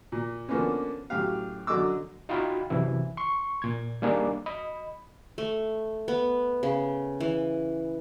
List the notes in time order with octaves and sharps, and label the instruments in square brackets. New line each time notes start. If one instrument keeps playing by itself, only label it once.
[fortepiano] A#2
D3 F3 A#3 B3 C#4
F#2 A2 G4 F5
F#2 D3 D#5 D6 E6
[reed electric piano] D#4 F4 F#4 G5 B5
F#2 C3 E3 E4
C6 C#6
A#2 G#6
G3 A#3 D4 D#4 G#4
D#5 B5
[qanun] A3
B3
C#3
E3